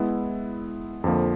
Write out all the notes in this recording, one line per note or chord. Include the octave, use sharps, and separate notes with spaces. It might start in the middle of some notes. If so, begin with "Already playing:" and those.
Already playing: G#3 B3 E4
F2 D3 F3 A#3